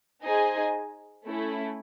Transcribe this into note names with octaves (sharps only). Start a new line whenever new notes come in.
D#4 G#4 C5 D#5 G#5
A3 C#4 E4